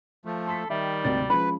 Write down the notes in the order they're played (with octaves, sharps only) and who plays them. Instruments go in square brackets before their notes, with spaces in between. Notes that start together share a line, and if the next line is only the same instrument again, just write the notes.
[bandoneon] F3 A3
[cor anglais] A4 [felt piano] C6 B6
[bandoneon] D#3 [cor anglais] G3 [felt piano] E5
[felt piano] G#1 D2 C3 [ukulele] D5
[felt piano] F3 G#3 C#4 [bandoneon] B4 [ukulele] B5